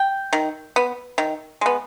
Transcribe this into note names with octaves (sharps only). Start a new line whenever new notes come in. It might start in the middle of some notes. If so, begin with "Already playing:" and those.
Already playing: G5
D#3
B3
D#3
G#3 B3